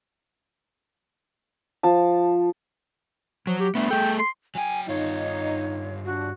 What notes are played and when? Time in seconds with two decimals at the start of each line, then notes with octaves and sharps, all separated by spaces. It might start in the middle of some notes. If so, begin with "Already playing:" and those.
1.83 F3 A5
3.47 F3 F#3
3.60 G4
3.75 A3 B3 D4
3.90 A3 G#4 A4 G5
4.19 C6
4.55 F#3 G5 G#5
4.89 G2 D#4 F4 C#5
6.05 D4 F#4